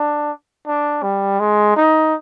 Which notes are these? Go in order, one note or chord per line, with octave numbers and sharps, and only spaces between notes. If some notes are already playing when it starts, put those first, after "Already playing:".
Already playing: D4
D4
G3
G#3
D#4